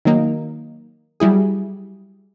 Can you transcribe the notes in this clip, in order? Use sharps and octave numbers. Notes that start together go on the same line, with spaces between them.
D#3 F#3 A#3 D#4
F#3 G3 E4 G#4